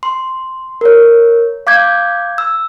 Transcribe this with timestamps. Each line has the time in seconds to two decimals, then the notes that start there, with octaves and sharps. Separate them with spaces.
0.03 C6
0.81 A#4 C#5
1.67 F5 D6 G6 G#6
2.38 E6